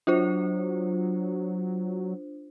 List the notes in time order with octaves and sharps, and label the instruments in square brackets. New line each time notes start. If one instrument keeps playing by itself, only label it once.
[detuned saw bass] F#3 [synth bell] D4 F4 C5